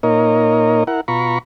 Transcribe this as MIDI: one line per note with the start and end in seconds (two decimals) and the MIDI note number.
0.03 0.84 46
0.03 0.84 58
0.03 0.84 63
0.03 0.84 70
0.03 0.84 73
0.03 0.84 75
0.87 1.01 64
0.87 1.01 70
0.87 1.01 78
1.08 1.38 47
1.08 1.38 65
1.08 1.38 82
1.08 1.38 83
1.08 1.38 85